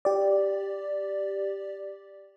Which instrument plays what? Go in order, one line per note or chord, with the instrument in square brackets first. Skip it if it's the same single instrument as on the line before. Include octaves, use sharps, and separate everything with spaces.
[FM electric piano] G4 D5